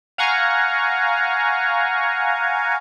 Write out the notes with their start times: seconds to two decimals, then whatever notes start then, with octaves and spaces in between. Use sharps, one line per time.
0.18 F5 F#5 G#5 A#5 C#6